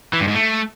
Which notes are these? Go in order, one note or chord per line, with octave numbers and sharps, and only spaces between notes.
E3
G2
G#2
A3